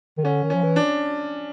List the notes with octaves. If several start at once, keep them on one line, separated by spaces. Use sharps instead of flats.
D#3
D3 C#4
D#3
F3 C#4
E3
D4